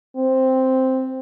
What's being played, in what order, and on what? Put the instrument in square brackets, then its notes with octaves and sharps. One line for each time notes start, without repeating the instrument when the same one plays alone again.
[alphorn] C4